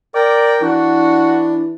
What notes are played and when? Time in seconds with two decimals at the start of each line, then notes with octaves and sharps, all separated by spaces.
0.15 A#4 D5 G5
0.61 E3 D4 F#4